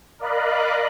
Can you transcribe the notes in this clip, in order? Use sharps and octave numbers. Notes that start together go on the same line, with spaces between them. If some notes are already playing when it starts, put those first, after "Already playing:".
A#4 D5 D#5 F5 B5 F#6